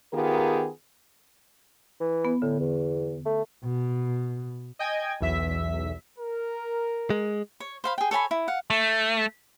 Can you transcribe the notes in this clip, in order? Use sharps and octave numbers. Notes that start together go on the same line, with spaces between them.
D#3 B3 F4 G4 G#4 A#4
E3
B3
A2 D3
E2
A3
B2
D#5 G5 G#5 G#6
B1 E2 E5 B6
A#4
G#3
C#5
C5 F5 B5
G#4 G5
A4 C#5 G#5 B5
E4
F5 F#5
A3